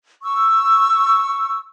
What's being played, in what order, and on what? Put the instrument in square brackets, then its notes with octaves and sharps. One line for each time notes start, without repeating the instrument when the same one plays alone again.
[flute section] C#6 E6